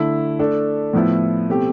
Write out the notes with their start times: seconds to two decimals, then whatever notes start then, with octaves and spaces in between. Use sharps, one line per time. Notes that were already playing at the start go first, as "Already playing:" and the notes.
Already playing: D3 A3 E4
0.39 A3 D4 A4
0.93 A2 F3 B3 E4
1.48 B2 A3 C4 G4